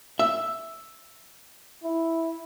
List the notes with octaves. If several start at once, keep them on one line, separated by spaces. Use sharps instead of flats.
E5
E4